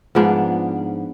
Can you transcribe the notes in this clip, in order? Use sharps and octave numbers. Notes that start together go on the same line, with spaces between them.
G#2 F3 B3 D4